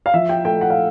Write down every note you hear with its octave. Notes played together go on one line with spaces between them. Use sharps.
F5
F3 E5
G5
A3 G5
F#5
F5